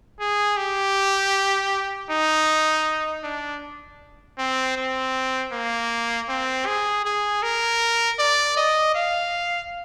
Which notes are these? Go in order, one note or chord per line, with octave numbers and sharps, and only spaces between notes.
G#4
G4
D#4
D4
C4
C4
A#3
C4
G#4
G#4
A#4
D5
D#5
F5